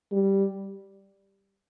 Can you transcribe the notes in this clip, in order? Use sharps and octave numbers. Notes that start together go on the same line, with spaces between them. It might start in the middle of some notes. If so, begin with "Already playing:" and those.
G3